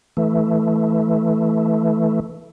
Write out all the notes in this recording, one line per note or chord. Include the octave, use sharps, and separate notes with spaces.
E3 A3